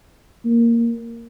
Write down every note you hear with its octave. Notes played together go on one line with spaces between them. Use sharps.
A#3